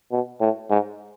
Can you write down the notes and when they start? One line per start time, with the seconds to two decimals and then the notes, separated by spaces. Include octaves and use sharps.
0.11 B2
0.41 A2
0.70 G#2